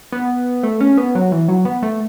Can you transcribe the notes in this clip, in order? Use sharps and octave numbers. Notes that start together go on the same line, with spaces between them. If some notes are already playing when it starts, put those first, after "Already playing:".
B3
A3
C#4
B3
F#3
E3
F#3
B3
A3